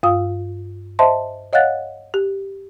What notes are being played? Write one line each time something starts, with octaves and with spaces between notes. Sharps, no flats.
G2 F4 F5 D#6
C5 D#5 E5 A5 C6
C#5 D#5 F5 F#5 F#6 A6
G4